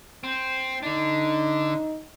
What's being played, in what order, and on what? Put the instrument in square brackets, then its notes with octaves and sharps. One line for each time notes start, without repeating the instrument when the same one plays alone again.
[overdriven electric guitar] C4
[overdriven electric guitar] D3 D4 [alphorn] D#4